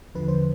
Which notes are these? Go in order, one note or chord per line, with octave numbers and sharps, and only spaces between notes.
E2 D3 F3 B4
C5